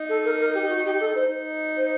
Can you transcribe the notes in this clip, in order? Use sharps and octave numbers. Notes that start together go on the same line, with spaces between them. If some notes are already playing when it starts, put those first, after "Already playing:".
Already playing: D#4
A4
A#4
A#4
G4
F#4
G4
A4
D#4 C5
C5